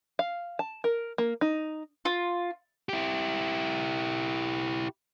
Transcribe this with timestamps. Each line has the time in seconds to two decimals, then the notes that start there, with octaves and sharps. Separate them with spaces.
0.19 F5
0.59 A5
0.84 A#4
1.18 A#3
1.41 D#4
2.05 F4
2.89 E4 G4